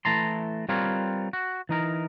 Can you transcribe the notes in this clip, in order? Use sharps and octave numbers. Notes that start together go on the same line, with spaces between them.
E3 A3 E4 A5 A#5 C6
G3 C4 F4 A#4 B4 C#5
F#4
E3 D#4 A#4